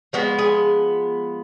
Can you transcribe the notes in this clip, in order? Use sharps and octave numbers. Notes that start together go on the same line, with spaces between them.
F3 G#3 B3 F#4
G#4